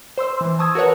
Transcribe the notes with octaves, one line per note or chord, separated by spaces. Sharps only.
C5 C6 E6
E3
A5 C#6 D#6 E6 G#6
F#4 A#4 B4 C#5 F#5